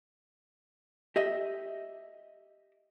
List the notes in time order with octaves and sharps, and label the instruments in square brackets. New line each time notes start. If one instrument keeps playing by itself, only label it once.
[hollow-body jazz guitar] G4 D#5 E5